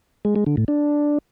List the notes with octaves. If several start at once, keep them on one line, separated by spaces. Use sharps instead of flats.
G#3
G#3
D3
A2
D4